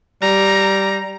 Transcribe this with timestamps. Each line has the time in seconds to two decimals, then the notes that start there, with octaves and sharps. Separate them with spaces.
0.22 G3 A#5